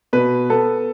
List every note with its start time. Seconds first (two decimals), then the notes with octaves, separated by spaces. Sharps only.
0.13 B2 B4
0.50 B3 A4